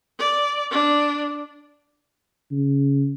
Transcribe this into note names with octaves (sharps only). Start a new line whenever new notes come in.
D5
D4
C#3